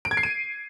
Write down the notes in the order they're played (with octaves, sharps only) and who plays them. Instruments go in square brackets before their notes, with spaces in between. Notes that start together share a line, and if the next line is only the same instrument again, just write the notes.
[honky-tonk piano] D7
G#6
C7
D#7